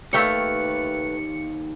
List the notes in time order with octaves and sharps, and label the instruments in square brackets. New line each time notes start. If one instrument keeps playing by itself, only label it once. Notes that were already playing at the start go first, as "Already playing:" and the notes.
[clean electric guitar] D#2 A#3 F5 [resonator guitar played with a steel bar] A3 G4 C#5 [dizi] B4 [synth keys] C#7